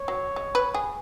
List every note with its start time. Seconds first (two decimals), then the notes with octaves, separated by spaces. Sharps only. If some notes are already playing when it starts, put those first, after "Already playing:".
Already playing: C#5
0.08 F#3
0.36 G#3
0.55 B4
0.74 G#4